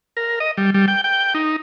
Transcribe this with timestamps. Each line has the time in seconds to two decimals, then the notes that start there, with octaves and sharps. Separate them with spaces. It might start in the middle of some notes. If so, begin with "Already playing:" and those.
0.17 A#4
0.40 D#5
0.57 G3
0.74 G3
0.88 G5
1.04 G5
1.35 D#4